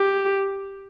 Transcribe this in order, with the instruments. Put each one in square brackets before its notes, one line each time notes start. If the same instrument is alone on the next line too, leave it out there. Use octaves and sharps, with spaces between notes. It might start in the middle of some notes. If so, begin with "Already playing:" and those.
Already playing: [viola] G4